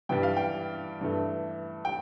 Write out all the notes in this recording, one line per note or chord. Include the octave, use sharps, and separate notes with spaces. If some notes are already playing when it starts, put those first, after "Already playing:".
G2 E3 G3 G5
F5
G5
G2 E3 A3
G5